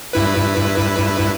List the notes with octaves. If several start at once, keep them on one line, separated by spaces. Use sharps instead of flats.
G2 E4 B4